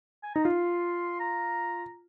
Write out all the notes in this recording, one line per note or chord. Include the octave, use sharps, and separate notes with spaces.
G#5
D#4 A#5
F4 C6
A#5